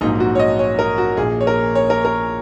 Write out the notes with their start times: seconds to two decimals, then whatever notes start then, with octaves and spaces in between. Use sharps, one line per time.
0.01 A#1 G#2 F#3 A#3 D#4
0.20 F#4
0.35 C#5
0.39 D#5
0.59 C#5
0.79 A#4
0.98 F#4
1.17 A#1 A#2 A#3 G#4
1.41 C#5
1.47 A#4
1.75 C#5
1.90 A#4
2.05 A#4